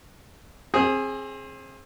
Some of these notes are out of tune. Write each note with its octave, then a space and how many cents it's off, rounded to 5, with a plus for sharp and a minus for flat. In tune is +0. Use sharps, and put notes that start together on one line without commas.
C4 +30 G#4 +0